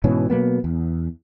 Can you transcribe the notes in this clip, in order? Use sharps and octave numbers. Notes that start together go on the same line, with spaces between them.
G#2 B2 E3 C#4
B2 F#3 A#3 B3
E2